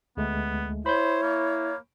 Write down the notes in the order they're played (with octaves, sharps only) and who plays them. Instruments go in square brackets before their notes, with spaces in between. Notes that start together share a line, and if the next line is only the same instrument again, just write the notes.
[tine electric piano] D2 G#3 A3 [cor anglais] B3
[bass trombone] E4 [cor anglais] C5 [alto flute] C#5 [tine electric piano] B5 G6
[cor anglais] A#3